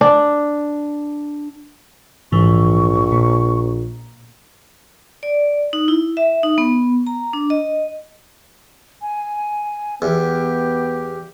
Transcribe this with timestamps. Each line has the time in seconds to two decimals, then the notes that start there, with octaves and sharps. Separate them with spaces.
0.01 D4
2.32 A#1 G#2 E3 C#6
3.12 A#2
5.23 D5
5.73 D#4
5.88 E4
6.17 E5
6.43 D#4
6.58 B3
7.07 A#5
7.33 D4
7.50 D#5
9.02 G#5
10.02 E2 B3 G4